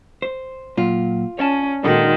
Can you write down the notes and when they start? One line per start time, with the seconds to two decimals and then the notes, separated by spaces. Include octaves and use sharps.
0.22 C5
0.77 A#2 F#3 F4
1.39 C#4 C#5 D5 A5
1.84 A#2 D#3 G#3 D4 D#4 F#4 A4